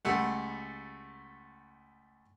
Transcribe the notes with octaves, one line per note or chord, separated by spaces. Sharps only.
C#2 G3 A3 F#5